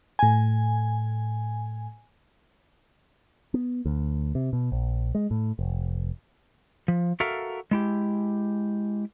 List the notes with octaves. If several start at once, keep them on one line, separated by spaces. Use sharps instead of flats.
A2 G#5
B3
D2
C3
B2
A#1
G#3
A2
F1
F3
F#4 A4 A#4 E5 F5
G#3 E4 G4